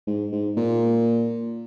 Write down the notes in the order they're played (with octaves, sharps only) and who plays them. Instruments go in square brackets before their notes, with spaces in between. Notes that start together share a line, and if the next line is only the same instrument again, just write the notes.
[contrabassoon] G#2
G#2
A#2